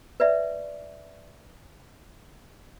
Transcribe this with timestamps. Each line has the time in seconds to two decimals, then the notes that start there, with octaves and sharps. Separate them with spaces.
0.20 B4 D5 E5